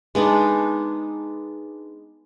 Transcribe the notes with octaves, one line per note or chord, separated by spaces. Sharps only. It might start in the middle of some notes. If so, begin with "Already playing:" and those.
G#3 B3 D4 D#4